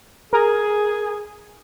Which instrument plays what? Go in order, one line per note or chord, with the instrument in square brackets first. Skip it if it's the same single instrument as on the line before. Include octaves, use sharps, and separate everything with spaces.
[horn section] G#4 [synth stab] A#4